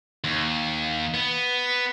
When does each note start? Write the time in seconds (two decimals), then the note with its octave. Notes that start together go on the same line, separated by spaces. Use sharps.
0.24 D#2
1.14 B3